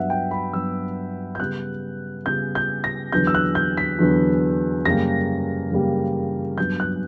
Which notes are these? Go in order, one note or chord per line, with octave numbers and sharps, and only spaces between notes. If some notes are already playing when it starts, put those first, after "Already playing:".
Already playing: G2 F#3 B3 E5 F#5
G5
B5
G2 F#3 B3 E6
G6
C#3 G3 B3 F#6
C#3 G3 B3 G6
G6
A#6
E2 D3 F#3 B3 G6
E6
F#6
G6
B6
E2 D3 F#3 B3
F#2 C#3 G3 A#3 A#6
F#2 C#3 G3 A#3
G2 F#3 B3 G6
F#6